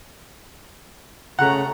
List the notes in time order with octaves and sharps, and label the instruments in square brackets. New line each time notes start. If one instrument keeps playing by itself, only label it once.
[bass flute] C#3 [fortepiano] A3 F#5 [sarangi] A#5